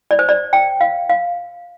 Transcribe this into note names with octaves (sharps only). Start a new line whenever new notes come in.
D5
C5
D5
G5
F5
F5